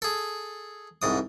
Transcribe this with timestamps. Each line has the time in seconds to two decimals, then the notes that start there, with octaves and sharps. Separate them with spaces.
0.02 G#4 A4
1.02 C2 G#2 D#6